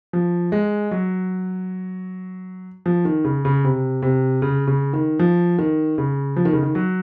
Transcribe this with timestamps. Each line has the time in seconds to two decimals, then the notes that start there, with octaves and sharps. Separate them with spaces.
0.13 F3
0.52 G#3
0.91 F#3
2.86 F3
3.05 D#3
3.25 C#3
3.45 C#3
3.64 C3
4.02 C3
4.42 C#3
4.67 C#3
4.93 D#3
5.19 F3
5.58 D#3
5.98 C#3
6.36 F3
6.45 D#3
6.53 C#3
6.63 D#3
6.75 F#3